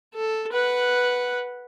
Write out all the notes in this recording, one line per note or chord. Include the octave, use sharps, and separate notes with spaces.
A4
B4 F#5